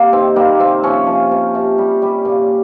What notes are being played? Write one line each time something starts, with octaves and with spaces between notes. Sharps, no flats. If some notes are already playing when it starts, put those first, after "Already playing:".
Already playing: C3 A#3
D#3 C4
G3 A#3
C3 C4
F3 C#4
F3
C3
C3
G3
G3
A#2